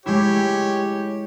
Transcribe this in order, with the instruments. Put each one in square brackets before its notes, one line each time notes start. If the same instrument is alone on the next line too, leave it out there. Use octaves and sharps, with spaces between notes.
[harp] G#3 E4 [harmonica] G4 C#5